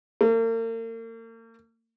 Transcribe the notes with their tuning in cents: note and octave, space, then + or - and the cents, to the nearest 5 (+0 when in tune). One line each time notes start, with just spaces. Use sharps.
A#3 -40